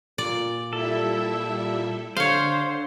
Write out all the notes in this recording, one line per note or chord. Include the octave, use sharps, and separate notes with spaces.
A#2 D5
G3 E4 A4 E5
D3 C5 C#5 F5